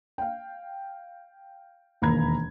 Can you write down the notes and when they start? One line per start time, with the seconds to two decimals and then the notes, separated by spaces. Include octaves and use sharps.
0.18 F5 G5
2.02 E1 D#2 A#3 A#5 B5 G#6